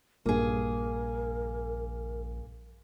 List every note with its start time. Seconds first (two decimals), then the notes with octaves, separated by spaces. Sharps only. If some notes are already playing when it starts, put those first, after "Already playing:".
0.26 A#1 G2 A#2 A#3 G#4 A#4